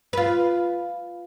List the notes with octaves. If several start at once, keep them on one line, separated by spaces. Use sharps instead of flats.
F4 B4